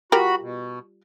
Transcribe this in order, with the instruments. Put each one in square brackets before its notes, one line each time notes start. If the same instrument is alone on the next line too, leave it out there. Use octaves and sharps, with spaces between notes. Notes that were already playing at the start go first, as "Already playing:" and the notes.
[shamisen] G3 F4 A#4 [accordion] F#4 B5
[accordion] B2